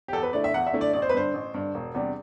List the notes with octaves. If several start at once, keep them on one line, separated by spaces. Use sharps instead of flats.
G4
E2 A4
B4
D3 A3 E4 D5
E5
E2 F#5
E5
D3 A3 E4
D5
A1 D5
C5
B4
G2 D3 C5
A1
G2 D3
E1
E2 C3 G3 D4